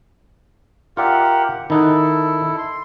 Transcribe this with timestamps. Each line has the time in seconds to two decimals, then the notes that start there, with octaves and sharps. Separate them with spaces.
0.97 F4 G4 A#4 D5 E5 F#5
1.70 D#3 D#4 E4 A4 F#5
2.58 C6